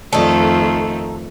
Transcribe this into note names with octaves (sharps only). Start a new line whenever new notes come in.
F2 D#3 A3 D#4 A4